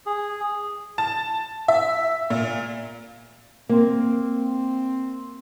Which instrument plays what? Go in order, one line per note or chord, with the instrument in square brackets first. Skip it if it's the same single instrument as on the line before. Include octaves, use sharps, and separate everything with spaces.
[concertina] G#4
[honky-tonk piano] A5
E5
A#2
[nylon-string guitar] A#3 [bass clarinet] C4